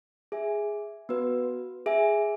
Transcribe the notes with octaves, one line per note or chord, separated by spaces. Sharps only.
G#4 E5 G#5
B3 F#4 B4
G#4 E5 G#5